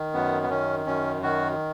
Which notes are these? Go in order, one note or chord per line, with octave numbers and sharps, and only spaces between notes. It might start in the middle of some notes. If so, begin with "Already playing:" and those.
Already playing: D#3
F#2 B3
B3
D#3 C#4
F#2 C#4
D#3 F#4